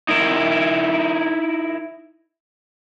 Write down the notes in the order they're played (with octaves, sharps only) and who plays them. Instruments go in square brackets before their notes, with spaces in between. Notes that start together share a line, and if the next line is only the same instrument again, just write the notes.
[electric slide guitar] D#4 E4 A#4